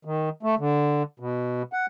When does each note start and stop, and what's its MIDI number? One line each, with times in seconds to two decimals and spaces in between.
0.05 0.29 51
0.43 0.55 57
0.59 1.03 50
1.20 1.62 47
1.73 1.86 78